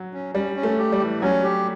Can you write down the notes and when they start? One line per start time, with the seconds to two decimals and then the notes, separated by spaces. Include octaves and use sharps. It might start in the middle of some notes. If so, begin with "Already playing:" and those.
Already playing: F#3
0.13 C#4
0.35 G3 C#4
0.56 C#4
0.63 A3
0.78 G4
0.92 G3
1.00 E3
1.22 F#3 C#4
1.43 G4